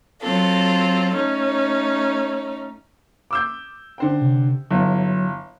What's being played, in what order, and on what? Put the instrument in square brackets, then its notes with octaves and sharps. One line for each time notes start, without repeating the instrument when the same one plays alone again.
[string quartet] F#3 C4 F4 A4
A3 C#4 D#4
[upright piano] D6 E6 G6
D3 C5 G5
[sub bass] C3
[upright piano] G1 E4 [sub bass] F#3